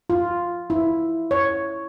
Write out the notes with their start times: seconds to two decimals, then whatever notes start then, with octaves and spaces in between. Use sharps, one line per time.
0.10 F4
0.70 E4
1.31 C#5